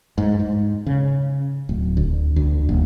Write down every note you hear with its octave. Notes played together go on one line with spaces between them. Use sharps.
G#2
G#2
C#3
D1
D2
D2
D#1